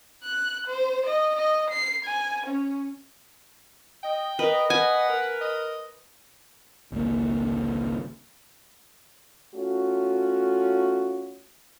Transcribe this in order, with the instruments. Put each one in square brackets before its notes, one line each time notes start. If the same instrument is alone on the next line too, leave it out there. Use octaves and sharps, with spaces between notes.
[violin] F#6
C5
D#5
D#5
C7
G#5
C#4
[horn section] D#5 [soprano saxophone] G5
[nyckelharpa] A#4 [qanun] B4 [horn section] D#5
[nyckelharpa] B4 [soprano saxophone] F#5 [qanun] G#5
[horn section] A#4
[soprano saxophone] D#5
[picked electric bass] G#1 C#2 A#3
[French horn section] A3 C#4 F4 F#4